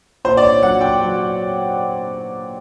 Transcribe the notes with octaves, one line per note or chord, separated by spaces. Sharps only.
A#2 C5
D5
C#5
F#3 F#5
G5
F#3